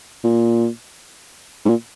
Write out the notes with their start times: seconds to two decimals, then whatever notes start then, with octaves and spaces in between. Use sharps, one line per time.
0.24 A#2
1.65 G#2
1.69 A#2